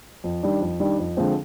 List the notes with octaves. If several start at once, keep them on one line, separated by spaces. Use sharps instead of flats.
F2
D#3 G3 D4
F2
D#3 G3 D4
F2
D3 F3 G#3 C4